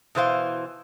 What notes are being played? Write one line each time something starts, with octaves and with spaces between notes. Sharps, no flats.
B2 E3 C5 F5